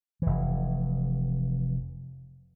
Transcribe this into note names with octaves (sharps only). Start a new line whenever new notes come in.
F1 E3